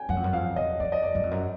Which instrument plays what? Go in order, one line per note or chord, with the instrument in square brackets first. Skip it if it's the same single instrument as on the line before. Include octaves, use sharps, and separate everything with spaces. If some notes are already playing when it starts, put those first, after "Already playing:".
Already playing: [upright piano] G5 G#5
[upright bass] F#2 [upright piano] F#5
[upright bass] F2
F#2
[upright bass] F2 [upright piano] F5
[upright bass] F2 [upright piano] D#5
[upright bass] F2 [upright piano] D5
[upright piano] D#5
D5
[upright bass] F#2
F2
F#2